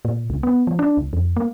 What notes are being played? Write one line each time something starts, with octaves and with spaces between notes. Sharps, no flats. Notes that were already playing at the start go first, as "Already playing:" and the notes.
A#2
C#2
B3
F3
D4
C#2
F2
A#3